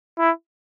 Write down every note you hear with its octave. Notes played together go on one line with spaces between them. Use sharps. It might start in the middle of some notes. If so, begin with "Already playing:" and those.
E4